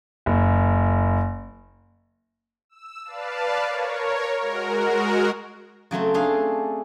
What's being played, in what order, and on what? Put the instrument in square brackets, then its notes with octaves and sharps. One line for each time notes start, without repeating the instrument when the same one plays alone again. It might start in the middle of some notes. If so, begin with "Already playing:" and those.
[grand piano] F#1
[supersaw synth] E6
B4 D5 F5 A5
A#4 C#5
G#3 F#4 A#4
[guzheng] C#3 F#3 A3 C4
A3 D4 G#4 F5